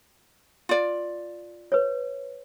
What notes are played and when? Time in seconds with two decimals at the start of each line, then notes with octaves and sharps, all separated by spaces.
0.69 F4 D5
1.72 B4 C#5